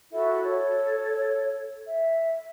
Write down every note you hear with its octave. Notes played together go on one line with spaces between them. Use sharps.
E4 F#4 A4 E5
A4 C#5
E5